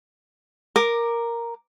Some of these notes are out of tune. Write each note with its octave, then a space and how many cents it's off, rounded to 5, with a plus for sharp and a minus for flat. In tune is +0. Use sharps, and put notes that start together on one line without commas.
A#4 +0 D6 +15